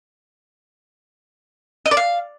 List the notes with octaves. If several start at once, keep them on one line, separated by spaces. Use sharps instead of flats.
D#5
D5
F5